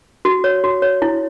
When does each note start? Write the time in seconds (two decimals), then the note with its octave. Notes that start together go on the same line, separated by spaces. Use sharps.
0.25 F#4
0.44 C#5
0.64 F#4
0.82 C#5
1.02 E4